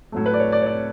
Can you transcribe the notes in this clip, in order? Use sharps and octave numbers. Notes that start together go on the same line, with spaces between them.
A2 F#3 A3
B4
D5
C#5
D5
C#5
D5